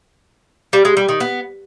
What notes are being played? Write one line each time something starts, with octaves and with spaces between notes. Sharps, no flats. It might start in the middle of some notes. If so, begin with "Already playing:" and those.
G3
G#3
G3
D#3
B3